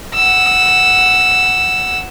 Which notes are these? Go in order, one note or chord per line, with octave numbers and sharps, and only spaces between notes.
F#5 E6